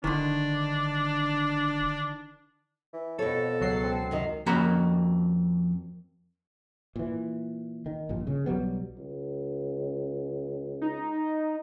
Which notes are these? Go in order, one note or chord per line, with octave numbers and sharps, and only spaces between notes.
D#1 D3 D#3 D4
E3
F2 B2 A4 C#5
C#2 F#3 C7
C4
C3 D#3 D#5
F2 A#3 C#4 F#4 A#5 B5
A#2 E3
D#3
A#1 G2 A#2
C#3
B1 F#3 G3 B3
C#2
D#4